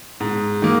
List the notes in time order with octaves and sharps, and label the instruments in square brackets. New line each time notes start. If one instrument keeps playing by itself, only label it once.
[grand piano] G#2
D#3 A#3